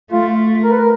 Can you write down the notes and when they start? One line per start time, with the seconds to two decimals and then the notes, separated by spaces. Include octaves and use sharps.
0.12 A3 F4
0.64 A#4
0.71 B4
0.79 A#4